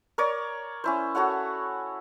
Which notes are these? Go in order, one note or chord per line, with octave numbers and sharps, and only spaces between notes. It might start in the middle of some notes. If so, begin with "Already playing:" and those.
A#4 C#5 D5
C#4 E4 C5
F#4 A4 C#5 F#5